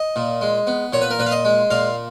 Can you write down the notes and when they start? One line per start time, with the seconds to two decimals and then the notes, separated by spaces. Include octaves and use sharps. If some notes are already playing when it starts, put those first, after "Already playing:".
Already playing: D#5
0.16 A#2
0.41 G#3
0.67 B3
0.93 A#2 C#5
1.02 B4
1.11 A#4
1.19 A#2 B4
1.26 F5
1.32 D#5
1.45 G#3
1.70 A#2 F5